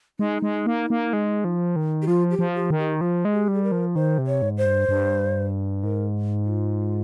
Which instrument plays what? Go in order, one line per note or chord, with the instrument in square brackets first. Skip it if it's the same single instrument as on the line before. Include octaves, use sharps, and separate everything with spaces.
[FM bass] G#3 [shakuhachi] D#4
[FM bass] G#3
A#3
A#3
G#3
F3
D#3
[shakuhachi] G4
[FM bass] F3 [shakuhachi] F4
[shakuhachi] G4
[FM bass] F3
[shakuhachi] G4
[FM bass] D#3
[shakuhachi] G4
[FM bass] F3 [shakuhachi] F4
[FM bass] G#3
[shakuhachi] G4
[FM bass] G3
[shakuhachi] G#4
A#4
[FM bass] F3
[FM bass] D#3 [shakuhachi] C5
[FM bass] C3
[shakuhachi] C#5
[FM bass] G#2
[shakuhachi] C5
[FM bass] G2
G2
[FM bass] G#2 [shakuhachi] A#4
[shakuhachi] F4